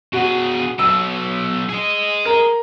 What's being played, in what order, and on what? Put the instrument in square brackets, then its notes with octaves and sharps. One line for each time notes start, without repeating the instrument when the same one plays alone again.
[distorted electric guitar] B2 G#4 [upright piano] F#4
[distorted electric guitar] B1 B2 [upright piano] E6
[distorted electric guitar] G#4 D#5
[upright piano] A#4